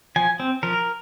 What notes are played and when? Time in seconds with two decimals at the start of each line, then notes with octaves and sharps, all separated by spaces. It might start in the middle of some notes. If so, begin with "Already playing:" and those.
0.16 F3 G#5
0.40 C4
0.63 F3 A#4